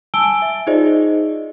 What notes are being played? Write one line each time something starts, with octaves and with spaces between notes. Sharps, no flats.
G#5 A5 E6 D7 G7
E5
D#4 F4 G#4 C5 D5 D#5